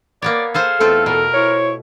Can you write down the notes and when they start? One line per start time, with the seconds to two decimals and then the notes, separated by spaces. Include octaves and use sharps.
0.22 A#3 B3 C#5 D5
0.54 G#4 A4 C5 F5
0.80 E2 A3 C4 F4 A4
1.06 B2 A#4
1.34 E4 C5 C#5